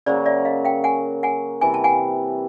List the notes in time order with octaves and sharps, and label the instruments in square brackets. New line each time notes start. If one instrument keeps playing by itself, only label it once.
[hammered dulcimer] C#3 F#3 A#3 [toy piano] C5 D5
[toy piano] D5 E5
D#5 F5
F5 G5
F#5 G#5
F#5 G#5
[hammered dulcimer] C3 E3 G3 [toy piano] G#5
[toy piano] A5
F#5 G#5